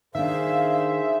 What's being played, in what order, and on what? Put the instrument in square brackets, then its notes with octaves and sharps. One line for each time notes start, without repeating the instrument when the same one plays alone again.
[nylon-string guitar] D#3 D4 [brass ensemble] G#4 C5 [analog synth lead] E5 [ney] F5